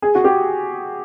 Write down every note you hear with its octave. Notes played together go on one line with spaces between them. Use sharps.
G#4
F#4
G4